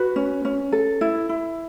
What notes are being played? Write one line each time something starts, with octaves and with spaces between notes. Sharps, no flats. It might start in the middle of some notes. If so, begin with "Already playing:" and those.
Already playing: F#4 B4
C#4
C#4
A4
E4
E4